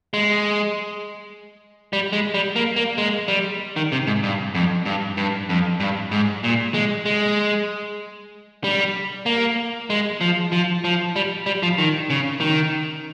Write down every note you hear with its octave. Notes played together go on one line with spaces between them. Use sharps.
G#3
G3
G#3
G3
A#3
A#3
G#3
G3
D#3
C3
G#2
G2
F2
G2
G2
F2
G2
G#2
A#2
G#3
G#3
G3
A#3
G#3
F3
F3
F3
G3
G3
F3
D#3
C#3
D#3